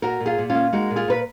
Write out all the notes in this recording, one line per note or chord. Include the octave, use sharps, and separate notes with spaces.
A#2 F#4 A#4
A#2
F4 G#4
A#2
C#4 F4
A#3
G#3 D#4 F#4
A#2
F4 G#4
A#2 B4